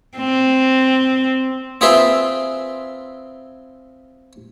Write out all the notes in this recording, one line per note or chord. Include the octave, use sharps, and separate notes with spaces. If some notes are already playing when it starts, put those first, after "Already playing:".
C4
C4 F4 G#4 B4 E5 C6